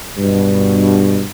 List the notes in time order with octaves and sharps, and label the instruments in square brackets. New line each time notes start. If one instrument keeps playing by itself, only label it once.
[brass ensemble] G2 B2